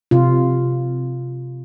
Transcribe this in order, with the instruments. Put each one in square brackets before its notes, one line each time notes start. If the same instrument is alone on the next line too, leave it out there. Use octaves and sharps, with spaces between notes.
[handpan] C3 F4